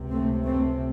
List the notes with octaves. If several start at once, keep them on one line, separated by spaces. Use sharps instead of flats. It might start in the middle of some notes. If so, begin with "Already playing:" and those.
Already playing: C#2 C3
A3 C4
A3 C4